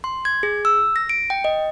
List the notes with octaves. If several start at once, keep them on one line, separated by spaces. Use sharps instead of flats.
C6
G#6
G#4
E6
A#6
D7
G5
D#5